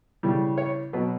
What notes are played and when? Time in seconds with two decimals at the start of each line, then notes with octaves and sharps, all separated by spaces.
0.23 C#3 E3 G3
0.58 C#5
0.93 B2 F#3 B4